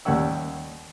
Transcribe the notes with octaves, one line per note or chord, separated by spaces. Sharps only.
D#2 G3 A#3 C#4 F#5 E6